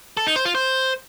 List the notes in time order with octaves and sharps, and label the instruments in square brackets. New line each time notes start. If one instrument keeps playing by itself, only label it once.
[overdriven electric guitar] A4
D#4
C5
F4
C5